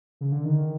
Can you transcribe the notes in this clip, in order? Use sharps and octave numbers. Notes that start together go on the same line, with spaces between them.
C#3
D3
D#3